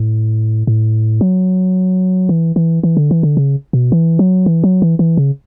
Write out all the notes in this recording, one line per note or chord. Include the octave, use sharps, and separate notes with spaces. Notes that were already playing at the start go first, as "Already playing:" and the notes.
Already playing: A2
A2
F#3
E3
E3
E3
D3
E3
D3
C#3
B2
E3
F#3
E3
F#3
E3
E3
C#3